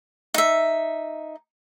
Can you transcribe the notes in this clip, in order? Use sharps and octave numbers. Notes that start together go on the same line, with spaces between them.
D#4 E5